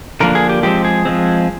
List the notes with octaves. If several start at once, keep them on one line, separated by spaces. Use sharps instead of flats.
D3 F3 A#3 D4 A#4
G#4
G4
F3 G#3 C4 G4
G#4
F3 G#3 C4